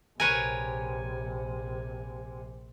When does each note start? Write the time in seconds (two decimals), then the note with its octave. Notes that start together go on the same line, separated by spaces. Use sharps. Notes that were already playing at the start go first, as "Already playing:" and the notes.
0.20 A#1 C3 A#4 B4 C#5 G#5